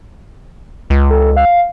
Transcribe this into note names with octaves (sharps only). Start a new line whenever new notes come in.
C#2
A4
F5